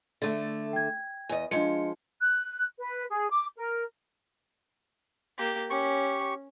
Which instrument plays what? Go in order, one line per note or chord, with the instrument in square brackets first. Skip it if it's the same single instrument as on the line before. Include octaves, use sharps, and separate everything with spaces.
[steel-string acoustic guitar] D3 A3
[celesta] G5 G#6
[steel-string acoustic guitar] E2 D#5 [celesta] G#5
[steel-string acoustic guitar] F3 G#3 [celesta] D4 D#5 C#7
[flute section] F#6
B4
G#4
D6
A#4
[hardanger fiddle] A#3 G4
[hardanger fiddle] C#4 [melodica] G4 C#6